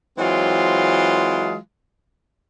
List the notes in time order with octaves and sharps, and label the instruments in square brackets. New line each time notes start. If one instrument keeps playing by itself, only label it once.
[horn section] E3 F#3 G#3 C4 F4